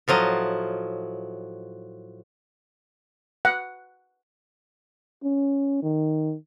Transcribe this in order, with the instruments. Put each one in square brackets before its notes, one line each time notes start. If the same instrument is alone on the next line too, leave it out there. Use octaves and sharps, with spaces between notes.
[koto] A2 F3 F#3 D#5
[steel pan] F#5
[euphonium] C#4
D#3